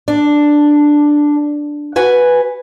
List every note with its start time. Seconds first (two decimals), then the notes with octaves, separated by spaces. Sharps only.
0.08 D4
1.96 F#4 B4 G#5